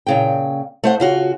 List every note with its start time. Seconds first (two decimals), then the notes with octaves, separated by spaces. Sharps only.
0.07 A#2 C#3 G5
0.84 A3 C5 F#5
1.00 C#3 F4 F#4